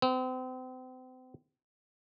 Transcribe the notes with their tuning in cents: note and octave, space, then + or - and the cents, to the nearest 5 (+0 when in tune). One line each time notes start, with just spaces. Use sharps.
C4 -35